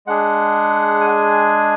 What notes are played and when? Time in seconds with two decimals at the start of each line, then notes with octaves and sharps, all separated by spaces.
0.06 G#3 D4 G#4 F#5
1.01 G#5